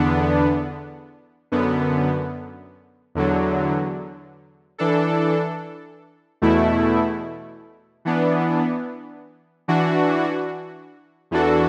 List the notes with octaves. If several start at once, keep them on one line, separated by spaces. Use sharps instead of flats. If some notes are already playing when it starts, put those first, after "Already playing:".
Already playing: E2 D3 B3 D4
F#2 D3 B3
E2 D3 F#3
E3 D4 A4
E2 B2 A3 E4
E3 B3 D4
E3 D4 F#4
E2 E3 D4 F#4 A4